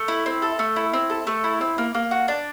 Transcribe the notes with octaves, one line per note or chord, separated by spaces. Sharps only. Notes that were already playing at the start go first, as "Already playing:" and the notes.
Already playing: A3
E4
C4
A4
A3
E4
C4
A4
A3
E4
C4
A#3
A#3
F#4
D4